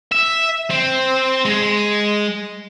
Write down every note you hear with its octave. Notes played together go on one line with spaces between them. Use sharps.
E5
C4
G#3